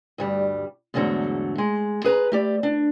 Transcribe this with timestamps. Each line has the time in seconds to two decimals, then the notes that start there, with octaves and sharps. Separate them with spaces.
0.18 D2 G2 G3
0.94 E2 G#2 D3 F#3 A3
1.58 G#3
2.04 G#4 B4 A5 A#5
2.32 A3 G4 D5
2.63 D4